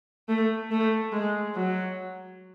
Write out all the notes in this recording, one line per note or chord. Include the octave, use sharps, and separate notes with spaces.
A3
A3
G#3
F#3